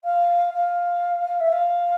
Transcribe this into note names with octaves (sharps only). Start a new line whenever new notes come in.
F5
F5
E5
F5